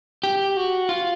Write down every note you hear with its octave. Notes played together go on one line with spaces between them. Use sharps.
G4
F#4
F4